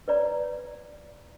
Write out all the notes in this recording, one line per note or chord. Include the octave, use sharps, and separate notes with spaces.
B4 C#5 D5 A#5